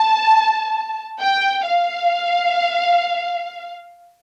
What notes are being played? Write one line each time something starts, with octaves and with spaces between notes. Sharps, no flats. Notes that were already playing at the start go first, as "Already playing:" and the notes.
Already playing: A5
G5
F5